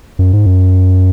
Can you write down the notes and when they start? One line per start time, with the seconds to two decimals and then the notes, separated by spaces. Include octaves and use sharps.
0.19 F#2
0.33 G#2
0.45 F#2